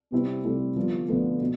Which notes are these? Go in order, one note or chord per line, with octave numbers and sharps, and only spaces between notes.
C3 G3 B3 C4 E4
C3 G3 A3 C4 E4
D3 F3 G3 B3 F4
D3 F3 A3 B3 F4
B2